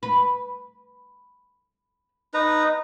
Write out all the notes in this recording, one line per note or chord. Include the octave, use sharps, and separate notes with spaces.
B4
D#4 B4 A#5